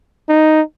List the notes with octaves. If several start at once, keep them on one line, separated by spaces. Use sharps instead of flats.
D#4